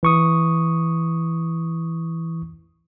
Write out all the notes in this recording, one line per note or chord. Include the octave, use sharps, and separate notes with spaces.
E3 C#6 D#6